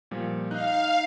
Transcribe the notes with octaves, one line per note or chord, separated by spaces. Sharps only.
A#2 F3 G3
D#4 F5 F#6